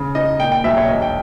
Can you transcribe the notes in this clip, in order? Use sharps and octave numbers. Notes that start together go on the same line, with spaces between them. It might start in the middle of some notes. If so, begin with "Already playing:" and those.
Already playing: C#3
D#4 D#5
A#2 G5
G5
B1 E5
C#5
E1 D#5
G5